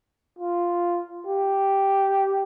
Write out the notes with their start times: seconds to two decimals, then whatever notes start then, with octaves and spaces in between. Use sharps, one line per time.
0.39 F4
1.26 G4